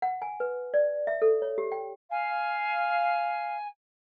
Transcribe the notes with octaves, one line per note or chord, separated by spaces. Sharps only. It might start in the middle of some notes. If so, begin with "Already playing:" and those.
F#5
G#5
B4
D5
E5
A4
C#5
G4
G5
F5 G#5